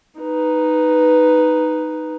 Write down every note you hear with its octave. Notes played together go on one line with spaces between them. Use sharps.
D#4 B4